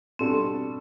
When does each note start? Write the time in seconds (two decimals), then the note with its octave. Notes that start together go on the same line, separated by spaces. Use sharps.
0.19 B2 G3 C4 D4 A4